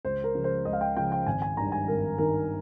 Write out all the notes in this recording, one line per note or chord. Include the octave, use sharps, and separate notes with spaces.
C#2 C5
A#4
C#3 F3 G#3
C5
C#2 D#5
F5
G5
C#3 F3 G#3 G5
G5
G#1 G#5
G#5
G2 D#3 A#5
G#5
G#1 A#4
G2 D#3 A#4